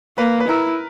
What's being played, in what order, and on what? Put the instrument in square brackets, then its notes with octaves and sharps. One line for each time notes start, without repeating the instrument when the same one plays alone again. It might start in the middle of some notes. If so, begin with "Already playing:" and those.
[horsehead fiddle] A#3 [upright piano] B4
[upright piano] B4
[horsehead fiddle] E4 [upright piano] A#4